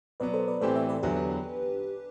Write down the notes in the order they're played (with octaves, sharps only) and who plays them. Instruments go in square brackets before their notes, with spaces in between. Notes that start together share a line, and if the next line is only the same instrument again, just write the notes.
[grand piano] B2 F#3 B3 [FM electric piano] B4 D5
[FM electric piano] A4 C5
B4 D5
[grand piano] A2 E3 A3 C4 G4 [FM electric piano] A4 C5
[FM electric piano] C5 E5
B4 D5
[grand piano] E2 D3 F#3 [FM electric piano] G4 B4
[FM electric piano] D4